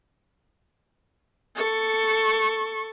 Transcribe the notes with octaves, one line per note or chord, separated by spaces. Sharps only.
A4 C#6